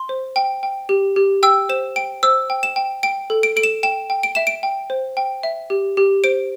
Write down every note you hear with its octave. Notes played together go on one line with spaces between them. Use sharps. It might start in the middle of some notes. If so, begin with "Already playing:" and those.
Already playing: C6
C5
G5
G5
G4
G4
G5 E6
C5 E7
G5 D7
C5 E6
G5
E7
G5
G5 D7
A4
D7
A4 D7
E7
G5 E7
G5
D7
E5 E7
D7
G5
C5
G5
E5
G4
G4
C5 D7